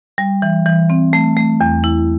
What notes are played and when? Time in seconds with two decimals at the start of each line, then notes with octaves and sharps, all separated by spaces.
0.18 G3
0.42 E3
0.66 E3
0.90 C4
1.13 A3
1.37 A3
1.61 E2
1.84 E4